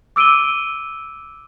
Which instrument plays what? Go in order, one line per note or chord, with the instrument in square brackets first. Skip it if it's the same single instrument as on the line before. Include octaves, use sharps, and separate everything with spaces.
[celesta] D6 E6 D7 D#7 G7